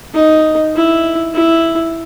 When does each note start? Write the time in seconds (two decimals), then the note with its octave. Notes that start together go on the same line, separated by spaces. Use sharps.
0.15 D#4
0.75 E4
1.34 E4